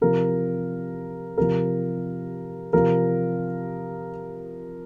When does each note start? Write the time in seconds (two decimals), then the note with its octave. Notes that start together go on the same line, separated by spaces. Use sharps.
0.01 C3 F3 A#4
1.37 C3 F3 A#4
2.73 C3 F3 A#4